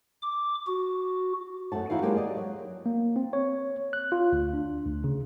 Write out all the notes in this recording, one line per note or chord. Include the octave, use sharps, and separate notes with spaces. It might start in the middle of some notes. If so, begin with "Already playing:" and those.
D6
F#4
F#2 A3 F#4 A5
E3 D#4 E4 F#4 F5
F#3 G#3 A#3 G4 A5
F#4 D5 D#5
F#3
A#3
C4
C#5
F#6
F4
D2
D4
D2
C#3